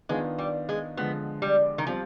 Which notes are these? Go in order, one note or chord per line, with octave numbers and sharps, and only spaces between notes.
D#3 G#3 B3 D4 F4
G3
G#3
D3 F3 G#3 B3
G3
D#3
F3 G3 C4 F4